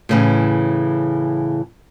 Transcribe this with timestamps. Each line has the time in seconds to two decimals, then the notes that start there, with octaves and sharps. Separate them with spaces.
0.09 A2 C#3 E3